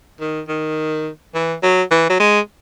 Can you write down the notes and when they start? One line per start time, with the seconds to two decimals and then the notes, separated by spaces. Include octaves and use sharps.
0.20 D#3
0.48 D#3
1.34 E3
1.63 F#3
1.91 E3
2.09 F#3
2.20 G#3